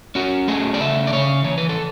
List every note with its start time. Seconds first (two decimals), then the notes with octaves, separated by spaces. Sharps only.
0.15 C#4 F#4
0.48 A3 G#4
0.74 D5
0.80 C#3 E5
1.07 D5
1.12 C#3 C#5
1.44 E3 C#5
1.58 B4
1.69 A4